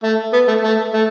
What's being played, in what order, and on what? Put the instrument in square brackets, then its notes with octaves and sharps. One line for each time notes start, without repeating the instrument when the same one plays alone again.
[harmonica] A3
B3
A3
A3
A3